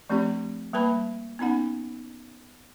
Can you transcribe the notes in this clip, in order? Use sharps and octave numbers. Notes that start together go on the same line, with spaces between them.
F3 A3 C4 D4 G4
G3 A#3 B4 A5 B5
B3 C#4 D#4 F#5